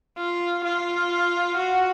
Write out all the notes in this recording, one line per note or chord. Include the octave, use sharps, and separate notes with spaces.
F4
F4
F#4